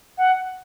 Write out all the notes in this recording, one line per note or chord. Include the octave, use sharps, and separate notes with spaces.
F#5